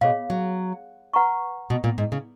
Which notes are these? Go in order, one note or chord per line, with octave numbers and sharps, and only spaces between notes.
B2 G#4 C#5 F5
F#3
B4 F#5 A#5 C#6
B2
A#2
G#2
C#3